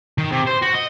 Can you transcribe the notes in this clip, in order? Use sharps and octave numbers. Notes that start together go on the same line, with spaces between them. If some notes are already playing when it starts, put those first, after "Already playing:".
D#3
C3
C5
F#4
D#5